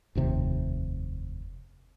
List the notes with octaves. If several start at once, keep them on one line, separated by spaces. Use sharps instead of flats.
F1 D#2 C3